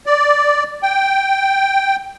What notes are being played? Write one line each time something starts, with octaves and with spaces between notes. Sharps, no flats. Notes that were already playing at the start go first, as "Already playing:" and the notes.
D5
G5